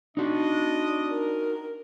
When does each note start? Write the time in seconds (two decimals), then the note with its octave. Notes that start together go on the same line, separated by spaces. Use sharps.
0.17 D4 D#4 F#4 D#5
1.10 A#4